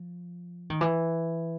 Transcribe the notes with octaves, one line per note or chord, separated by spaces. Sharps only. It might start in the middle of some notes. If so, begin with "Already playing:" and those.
Already playing: F3
D#3
E3